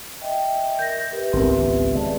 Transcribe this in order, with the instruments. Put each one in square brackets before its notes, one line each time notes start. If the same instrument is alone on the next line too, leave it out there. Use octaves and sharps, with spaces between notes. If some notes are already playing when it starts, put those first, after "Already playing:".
[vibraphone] D#5 E5 G5
[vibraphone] A#4 [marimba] G6 A#6
[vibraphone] G4 B4 E5 [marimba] A#4
[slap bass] G#1 C#2 B3 [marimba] C4
[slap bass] G#3 [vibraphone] D5 E5 A5